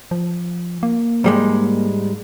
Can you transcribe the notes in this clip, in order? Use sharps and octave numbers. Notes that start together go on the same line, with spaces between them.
F3
A#3
G#2 G3 G#3